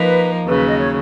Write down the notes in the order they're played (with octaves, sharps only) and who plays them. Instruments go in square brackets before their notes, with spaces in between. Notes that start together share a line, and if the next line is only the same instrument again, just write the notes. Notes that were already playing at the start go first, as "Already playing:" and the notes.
Already playing: [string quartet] F3 A#3 D#4 [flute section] B4
[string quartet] D#2 C#3 F#3 [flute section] B4
[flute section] D#5
C#5